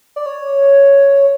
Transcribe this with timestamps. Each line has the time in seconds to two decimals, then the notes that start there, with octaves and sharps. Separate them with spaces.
0.16 D5
0.26 C#5